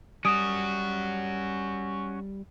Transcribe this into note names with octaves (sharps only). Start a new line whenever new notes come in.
G3 C#4 F#4 D#6 D7